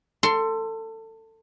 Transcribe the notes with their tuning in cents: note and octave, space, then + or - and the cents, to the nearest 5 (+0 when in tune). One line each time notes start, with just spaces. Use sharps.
A4 +25 C6 +0